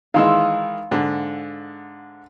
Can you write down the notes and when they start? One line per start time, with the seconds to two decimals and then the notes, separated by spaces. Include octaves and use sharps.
0.14 D#3 E3 G#3 F5 C6 E6
0.91 G#2 D3